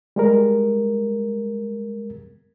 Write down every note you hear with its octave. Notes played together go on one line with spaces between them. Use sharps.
G3 G#3 A#4